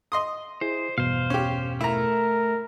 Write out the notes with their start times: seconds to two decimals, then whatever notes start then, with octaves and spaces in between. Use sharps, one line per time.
0.12 D#5 C6 D#6
0.61 E4 G#4 C5
0.98 E2 G2 B2 C5 F5
1.30 C#4 G4
1.81 A3 E4 A#4 A#5